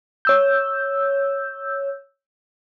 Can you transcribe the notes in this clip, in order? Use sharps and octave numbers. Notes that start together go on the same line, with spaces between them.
C#5 E6 G6